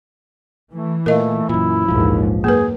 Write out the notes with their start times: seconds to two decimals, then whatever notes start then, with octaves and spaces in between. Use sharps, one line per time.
0.73 E3 A3
1.06 A#2 A3 A#4 D#5 F5
1.49 F#2 A#2 E4
1.88 A#1 D#2 G#2 E3 F3
2.44 F#2 A#3 G#4 B4